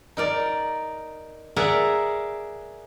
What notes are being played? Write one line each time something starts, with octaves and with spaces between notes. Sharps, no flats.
D#4 A#4 D5
G#4 A#4 D5 E5 F#5